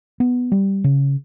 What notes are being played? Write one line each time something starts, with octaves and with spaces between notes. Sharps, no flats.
B3
G3
C#3